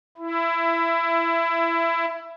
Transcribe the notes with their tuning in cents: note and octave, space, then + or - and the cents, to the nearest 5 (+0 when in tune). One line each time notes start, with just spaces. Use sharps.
E4 +15